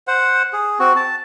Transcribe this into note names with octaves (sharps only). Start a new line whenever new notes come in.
C5 F#5
G#4
C4 F#4
A5